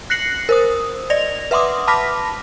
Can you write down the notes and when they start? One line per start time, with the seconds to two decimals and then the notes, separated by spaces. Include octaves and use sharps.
0.10 F#6 A#6 C7 C#7 F#7
0.49 A#4 C5 D#6
1.10 D5 D#5 A#6 F7
1.51 B4 E5 F#5 C6 D6 D#6
1.87 A5 B5 D6 F6 A#6 B6